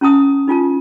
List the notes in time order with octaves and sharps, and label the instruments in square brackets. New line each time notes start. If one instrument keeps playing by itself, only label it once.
[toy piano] C#4 E4 A5 D#6
D#4 F4 G#5 A5